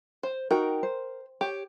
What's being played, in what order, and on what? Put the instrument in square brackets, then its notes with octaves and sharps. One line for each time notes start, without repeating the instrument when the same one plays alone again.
[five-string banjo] C5
[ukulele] D#4 F#4 G5 [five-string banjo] A#4
[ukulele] C5
[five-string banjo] G4 [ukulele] C#5